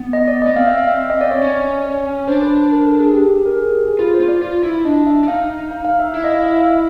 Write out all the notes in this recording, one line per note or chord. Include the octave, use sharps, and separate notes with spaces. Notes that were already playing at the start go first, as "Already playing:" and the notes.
Already playing: B3
D#5
D5
B3 D#5
C4 F5
E5
F5
E5
D#5
D5
C#5
C#4
C#5
D4 C5
B4
B4
A#4
A4
G#4
G4
A4
A#4
G#4
G4
G#4
F4 B4
C5
F4
D5
F4
E4
D4 D#5
E5
D4
D#4 F5
F5
F5
E5
E4 E5
D#5
F5
E5
F5